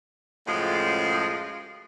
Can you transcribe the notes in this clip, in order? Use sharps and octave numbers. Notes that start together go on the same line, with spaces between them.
F#2 A2 C#3 F3 G#3